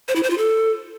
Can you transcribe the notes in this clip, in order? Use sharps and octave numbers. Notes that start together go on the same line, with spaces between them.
C5
E4
C5
F4
A4